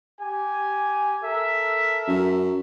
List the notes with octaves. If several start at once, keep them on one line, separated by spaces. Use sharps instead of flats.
G4 G#5
A4 A#4 E5
F#2